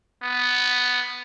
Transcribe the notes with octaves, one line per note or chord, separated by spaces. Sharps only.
B3